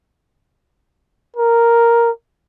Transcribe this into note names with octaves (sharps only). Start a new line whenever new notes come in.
A#4